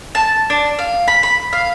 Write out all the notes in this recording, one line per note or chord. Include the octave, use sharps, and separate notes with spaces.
A5
D4
F5
B5
B5
F5